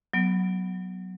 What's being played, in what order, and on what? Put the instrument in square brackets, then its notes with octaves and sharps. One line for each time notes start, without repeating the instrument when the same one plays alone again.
[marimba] F#3 B3